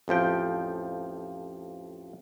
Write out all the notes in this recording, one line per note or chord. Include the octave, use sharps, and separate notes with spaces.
A1 F2 F3 G5